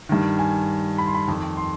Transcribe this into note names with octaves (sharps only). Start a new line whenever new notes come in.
G2 D#3
G#5
B5
C6
B5
F2 D#3
C6